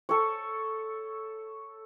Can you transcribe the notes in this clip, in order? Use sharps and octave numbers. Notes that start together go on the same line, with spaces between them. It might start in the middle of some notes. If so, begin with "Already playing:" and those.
A4 C#5